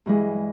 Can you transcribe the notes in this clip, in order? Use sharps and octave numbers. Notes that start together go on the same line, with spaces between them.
G2 E3 G#3